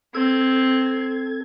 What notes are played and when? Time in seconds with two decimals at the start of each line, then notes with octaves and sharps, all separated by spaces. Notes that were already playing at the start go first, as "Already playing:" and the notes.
0.15 C4 A4 G#6